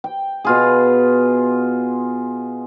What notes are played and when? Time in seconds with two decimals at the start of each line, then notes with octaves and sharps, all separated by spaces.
0.04 G5
0.45 B2 F4 G#4